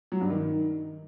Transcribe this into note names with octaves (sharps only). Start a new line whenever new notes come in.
F#3
G2
D#3